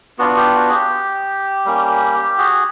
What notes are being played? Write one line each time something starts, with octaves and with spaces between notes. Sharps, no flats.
B3 D4 F4 F#4
F#4
G4
F#4
G#4
G4
G3 A#3 C#4
F#4 G#4